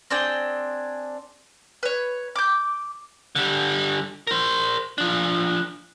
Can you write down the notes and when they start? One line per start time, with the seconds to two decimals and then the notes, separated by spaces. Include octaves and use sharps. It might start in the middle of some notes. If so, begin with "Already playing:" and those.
0.10 C4 D4 G#4 G5
1.83 B4 C#5
2.36 D6 G6
3.35 D3 G3
4.27 A#4 C5
4.98 F3 D4